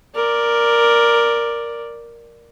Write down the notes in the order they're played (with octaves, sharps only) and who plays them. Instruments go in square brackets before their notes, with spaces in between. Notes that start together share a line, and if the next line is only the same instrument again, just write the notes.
[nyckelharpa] A#4 D5